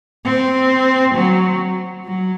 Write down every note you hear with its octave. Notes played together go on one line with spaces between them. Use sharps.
C4
F#3
F#3